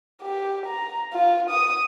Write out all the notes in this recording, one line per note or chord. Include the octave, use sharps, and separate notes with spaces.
G4
A#5
F4
D#6